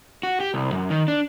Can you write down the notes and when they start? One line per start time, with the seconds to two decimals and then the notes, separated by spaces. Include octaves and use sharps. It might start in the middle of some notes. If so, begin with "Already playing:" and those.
0.23 F#4
0.40 G4
0.54 C2
0.72 F#2
0.90 D#3
1.08 D4